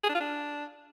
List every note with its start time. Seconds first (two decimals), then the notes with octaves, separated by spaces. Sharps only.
0.04 G#4
0.09 D4
0.15 F4
0.20 D4